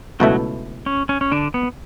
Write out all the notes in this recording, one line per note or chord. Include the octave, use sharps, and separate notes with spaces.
C#2 B2 F#3 A3 E4 F#4
C#4
C#4
C#4
D3 D4
B3